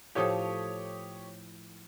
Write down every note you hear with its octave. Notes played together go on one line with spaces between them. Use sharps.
A2 F3 G4 A4 C#5 D#6